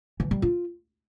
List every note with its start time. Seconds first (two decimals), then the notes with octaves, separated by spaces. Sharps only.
0.20 E3
0.31 G3
0.42 F4